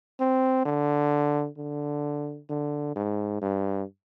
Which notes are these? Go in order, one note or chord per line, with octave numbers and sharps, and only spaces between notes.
C4
D3
D3
D3
G#2
G2